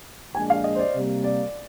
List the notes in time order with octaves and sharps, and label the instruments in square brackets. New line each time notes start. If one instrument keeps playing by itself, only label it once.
[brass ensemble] A#1 A#2 G#3 D4 [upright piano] G#5
[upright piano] F5
D#5
C5
D5
[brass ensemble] C3 G3 A#3
[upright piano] D5